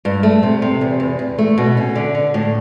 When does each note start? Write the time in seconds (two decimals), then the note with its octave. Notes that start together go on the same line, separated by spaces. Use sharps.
0.05 G2
0.23 A3
0.43 C3
0.62 C3
0.81 E2
1.00 E2
1.19 E2
1.38 A3
1.58 B2
1.77 C#4
1.95 D3
2.15 D3
2.34 A2